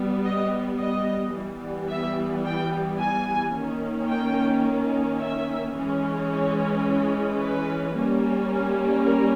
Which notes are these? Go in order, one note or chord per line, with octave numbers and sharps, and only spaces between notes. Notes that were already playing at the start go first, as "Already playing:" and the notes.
Already playing: G3 B3
D#5
D#5
E3 G3 B3
E5
G5
G#5
D#3 A#3 C#4
G5
E5
E3 G#3 C#4
C#5
B4
G3 A#3 C#4
A#4